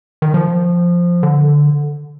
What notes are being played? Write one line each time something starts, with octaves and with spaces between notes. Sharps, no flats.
D#3
F3
D3